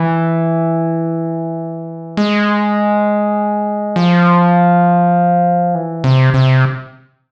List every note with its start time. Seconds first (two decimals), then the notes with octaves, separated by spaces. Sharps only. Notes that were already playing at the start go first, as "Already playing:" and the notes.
Already playing: E3
2.17 G#3
3.96 F3
5.75 E3
6.04 C3
6.34 C3